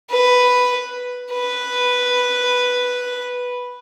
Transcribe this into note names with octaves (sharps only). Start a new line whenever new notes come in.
B4
B4